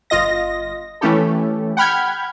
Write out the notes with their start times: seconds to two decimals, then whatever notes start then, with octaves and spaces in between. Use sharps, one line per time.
0.10 G1 F4 D#5 A#6
1.01 E3 A3 C#4 E4 G4 A4
1.77 F#5 G5 B5 F6 G6 G#6